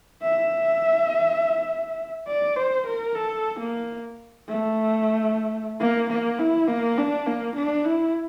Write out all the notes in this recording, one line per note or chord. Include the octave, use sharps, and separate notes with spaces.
E5
D5
C5
A#4
A4
A#3
A3
A#3
A#3
E4
A#3
D4
A#3
D4
E4